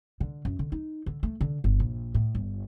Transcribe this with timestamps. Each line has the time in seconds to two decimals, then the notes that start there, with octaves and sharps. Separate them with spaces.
0.20 D3
0.45 F#2
0.59 D3
0.72 D#4
1.06 D3
1.23 A3
1.41 D3
1.64 G1
1.80 A#1
2.14 A2
2.35 G1